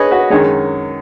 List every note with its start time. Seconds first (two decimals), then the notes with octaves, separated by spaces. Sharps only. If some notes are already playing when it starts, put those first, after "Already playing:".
Already playing: G#4 B4 C#5 D#5
0.11 F#4 B4
0.30 F#2 D#3 G#3 G#4 C#5